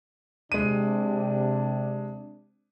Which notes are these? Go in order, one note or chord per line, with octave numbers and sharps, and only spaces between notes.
C3 G#3 D4 D#7